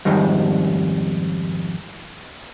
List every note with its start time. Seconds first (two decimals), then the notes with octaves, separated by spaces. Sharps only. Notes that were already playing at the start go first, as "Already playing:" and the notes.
0.05 F2 G#2 D#3 G3 G#3